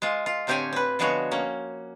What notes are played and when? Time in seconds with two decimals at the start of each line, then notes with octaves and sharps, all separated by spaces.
0.02 G#3 F4
0.26 F4
0.47 A2 D3 C4 G4 C#5 G#5
0.73 C4 B4
0.99 D3 F3 G#3 B3 F#4 C#5
1.31 A#3 C#4